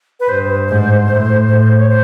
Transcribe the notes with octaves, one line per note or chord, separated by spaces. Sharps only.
B4
G2 C5
G#2
A2
A2
C#5
C5